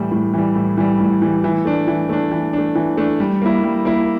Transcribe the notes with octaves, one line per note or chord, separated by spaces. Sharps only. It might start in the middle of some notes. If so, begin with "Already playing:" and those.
Already playing: A2 E3 G3
A2
E3 G3
A2
E3 G3
A2
E3 G3
E3
A3 D4
E3
A3 D4
E3
A3 D4
E3
A3 D4
G3
A#3 E4
G3
A#3 E4